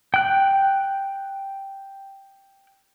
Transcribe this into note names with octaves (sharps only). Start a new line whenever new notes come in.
G5 F#6